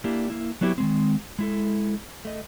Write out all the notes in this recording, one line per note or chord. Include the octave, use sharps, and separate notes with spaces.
A#3 D4 E4 G4
A#3 E4
F#3 B3 D4 E4 G4 C#5
D#3 G#3 C4
G#3 E4 A4
A3 D#5